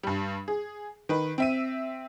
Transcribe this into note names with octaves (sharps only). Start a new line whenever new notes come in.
G2 G3
G#4
D#3 B4
C4 E5 D#7